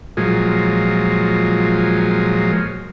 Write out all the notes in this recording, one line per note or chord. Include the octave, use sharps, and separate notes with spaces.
A#2 F3 F#3 G#3